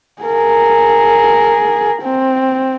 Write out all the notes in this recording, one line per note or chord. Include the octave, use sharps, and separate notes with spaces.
G#4 A#4
C4